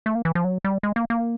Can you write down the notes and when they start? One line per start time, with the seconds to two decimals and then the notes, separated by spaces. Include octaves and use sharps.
0.06 A3
0.15 A#3
0.25 E3
0.35 F3
0.45 F#3
0.64 G3
0.83 G#3
0.96 A#3
1.10 A#3